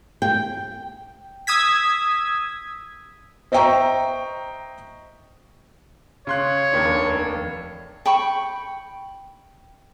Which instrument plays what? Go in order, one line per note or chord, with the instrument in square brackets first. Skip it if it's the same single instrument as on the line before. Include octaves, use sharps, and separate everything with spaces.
[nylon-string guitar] G5
[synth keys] D#6 E6 G#6 B6
[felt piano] C5 D#5 E5 G5 A#5 C#6
[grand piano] C#3 C6 F#6 [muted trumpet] C#5
[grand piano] F1 D#2 D4
[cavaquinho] G5 B5 C#6